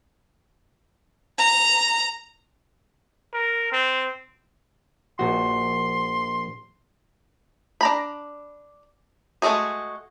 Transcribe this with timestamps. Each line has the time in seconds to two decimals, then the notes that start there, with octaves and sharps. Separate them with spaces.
1.38 A#5
3.34 A#4
3.72 C4
5.19 A#1 F#4 C6
7.81 D4 A#5 B5
9.42 G#3 A3 C4 F#4 G#4